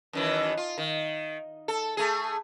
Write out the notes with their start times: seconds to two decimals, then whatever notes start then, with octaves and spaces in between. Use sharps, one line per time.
0.13 F#2 D#3 E3
0.57 F4
0.78 D#3
1.68 A4
1.97 A3 G#4